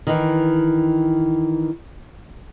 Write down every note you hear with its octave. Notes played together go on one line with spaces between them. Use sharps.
D#3 E3